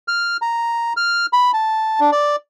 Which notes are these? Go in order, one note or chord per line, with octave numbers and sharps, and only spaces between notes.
F6
A#5
F6
B5
A5
D4
D5